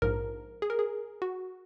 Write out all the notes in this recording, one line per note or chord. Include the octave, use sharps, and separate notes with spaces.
A#1 G#2 F3 A#4
G#4
A#4
G#4
F#4